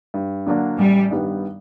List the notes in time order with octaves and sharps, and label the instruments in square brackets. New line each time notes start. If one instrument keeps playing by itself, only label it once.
[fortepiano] G2
D3 F#3 A#3 D4
[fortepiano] A1 [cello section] G3
[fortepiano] G2 D#3 G3 B3